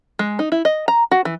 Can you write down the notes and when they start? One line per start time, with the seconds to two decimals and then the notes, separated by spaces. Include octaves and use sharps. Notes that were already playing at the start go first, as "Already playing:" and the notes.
0.19 G#3
0.39 D#4
0.52 E4
0.65 D#5
0.88 A#5
1.11 F#4
1.25 E3